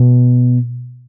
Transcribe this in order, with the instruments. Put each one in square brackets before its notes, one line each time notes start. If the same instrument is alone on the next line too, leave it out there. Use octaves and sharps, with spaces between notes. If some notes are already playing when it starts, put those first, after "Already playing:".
Already playing: [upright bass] B2